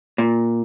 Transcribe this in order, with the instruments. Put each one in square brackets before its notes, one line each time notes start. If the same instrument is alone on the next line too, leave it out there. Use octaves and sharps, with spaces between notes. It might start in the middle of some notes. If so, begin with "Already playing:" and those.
[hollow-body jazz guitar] A#2